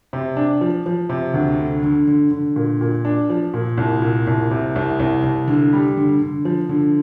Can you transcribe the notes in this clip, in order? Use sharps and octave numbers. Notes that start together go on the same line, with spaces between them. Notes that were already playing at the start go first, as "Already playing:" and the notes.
C3
D4
F3
F3
C3
D2
D3
D3
D3
D3
A#2
A#2
D4
F3
A#2
C2
A#2
C2
C3
C2
C2
C2
D3
G3
D3
D3
F3
D3